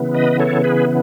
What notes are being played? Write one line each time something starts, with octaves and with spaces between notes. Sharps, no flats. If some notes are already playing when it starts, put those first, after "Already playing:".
Already playing: C#3 E3 B3
B4 D#5
A4 C#5
G#4 B4